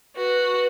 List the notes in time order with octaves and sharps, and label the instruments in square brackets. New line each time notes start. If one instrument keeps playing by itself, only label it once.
[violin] F#4 [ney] B4